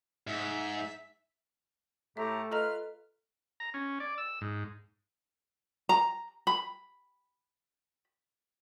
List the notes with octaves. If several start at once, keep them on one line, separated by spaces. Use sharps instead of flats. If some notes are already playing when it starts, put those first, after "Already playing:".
G#2 E5
A2 A3 G4 E5 A#5
F4 A4 B4 D#5 A#5 F6
A#5
C#4
D5
E6
G#2
A#5
B5